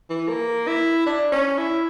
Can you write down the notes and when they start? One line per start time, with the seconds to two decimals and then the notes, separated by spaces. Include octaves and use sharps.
0.10 E3
0.29 A#3
0.68 E4
1.07 D4
1.32 C#4
1.58 E4